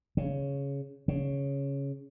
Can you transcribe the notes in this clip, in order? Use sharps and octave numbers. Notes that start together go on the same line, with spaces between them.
C#3
C#3